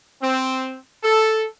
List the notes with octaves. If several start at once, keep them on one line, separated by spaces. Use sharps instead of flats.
C4
A4